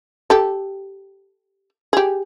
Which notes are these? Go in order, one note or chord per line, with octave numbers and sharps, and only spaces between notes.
G4 A4
G4 G#4